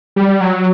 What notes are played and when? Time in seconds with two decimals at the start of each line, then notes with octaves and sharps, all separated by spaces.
0.16 G3
0.41 F#3